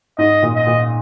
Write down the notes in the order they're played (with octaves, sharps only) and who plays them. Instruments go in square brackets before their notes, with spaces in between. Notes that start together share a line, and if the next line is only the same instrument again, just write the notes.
[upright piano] G#2 [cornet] D#5
[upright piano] A#2
[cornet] D#5
[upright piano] A#2